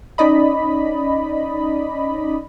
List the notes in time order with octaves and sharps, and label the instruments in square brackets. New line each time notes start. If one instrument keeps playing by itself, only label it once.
[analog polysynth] C#4 D#4 D5 D#5 B5